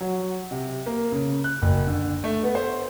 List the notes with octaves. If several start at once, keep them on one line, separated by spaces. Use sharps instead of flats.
F#3
C3
A#3
C#3
F#6
F#1
D3
A3
B3
C5